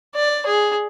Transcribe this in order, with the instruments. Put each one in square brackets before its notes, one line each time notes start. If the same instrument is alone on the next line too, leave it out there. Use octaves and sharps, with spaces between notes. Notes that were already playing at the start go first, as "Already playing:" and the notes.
[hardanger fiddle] D5
G#4